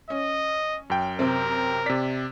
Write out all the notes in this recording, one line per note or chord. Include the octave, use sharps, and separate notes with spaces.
C#4 D#5
F#2 G5
C3 C4 A#4
C3 D5 B6